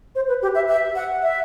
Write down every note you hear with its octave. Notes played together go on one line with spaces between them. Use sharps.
C5
B4
G4
E5
E5
F#5
E5